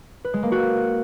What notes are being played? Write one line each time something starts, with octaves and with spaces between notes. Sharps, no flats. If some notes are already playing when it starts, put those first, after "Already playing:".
B4
G#3
A#3
F#4